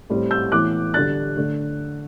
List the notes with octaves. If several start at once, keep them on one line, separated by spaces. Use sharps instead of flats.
A2 G3 C4
E6 G6
A2 E3 B3 D6 F#6
D3 G3 D4 F#6 A6
D3 A3 D4